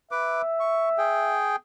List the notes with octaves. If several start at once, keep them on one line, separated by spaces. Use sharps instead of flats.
B4 E5 D6
C#6
G#4 G5